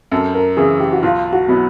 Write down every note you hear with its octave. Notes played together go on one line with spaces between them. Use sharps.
F#2 A4
A#4
C#3 E3 G#4
G4
F#4
B1 F4
F#4
B2 F#3 B3 E4